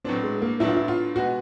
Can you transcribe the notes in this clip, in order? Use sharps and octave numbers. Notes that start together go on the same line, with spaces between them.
A2 F#3 B3 C4 D4
G#3
A#3
A2 F#3 B3 D4 E4
F4
E4
F4
B2 G#3 B3 F#4